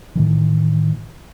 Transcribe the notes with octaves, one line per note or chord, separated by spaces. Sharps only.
A2 D#3 E3